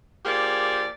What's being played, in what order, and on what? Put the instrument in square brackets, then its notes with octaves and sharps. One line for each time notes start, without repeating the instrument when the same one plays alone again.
[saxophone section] F3 A#3 G4 G#4 D5